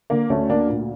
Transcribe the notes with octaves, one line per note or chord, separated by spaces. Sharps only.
D3 A#3
D2 A3 C#4
D2 A#3 D4
A#2